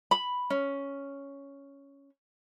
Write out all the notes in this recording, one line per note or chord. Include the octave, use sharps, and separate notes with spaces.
B5
C#4